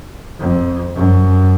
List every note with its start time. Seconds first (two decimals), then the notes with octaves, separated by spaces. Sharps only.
0.39 F2
0.95 F#2